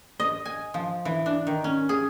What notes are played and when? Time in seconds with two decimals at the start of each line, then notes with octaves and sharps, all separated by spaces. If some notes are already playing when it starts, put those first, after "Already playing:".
0.20 D#5
0.45 G#5
0.74 F3
1.05 E3
1.26 D4
1.47 D#3
1.64 C#4
1.89 G#4